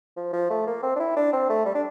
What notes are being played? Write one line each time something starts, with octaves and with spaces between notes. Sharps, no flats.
F3
F3
A3
A#3
C4
D4
E4
D4
C4
A3
G3
D4